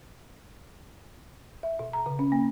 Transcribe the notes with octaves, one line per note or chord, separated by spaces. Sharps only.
E5
B2
A#5
C#3
C#4
A#3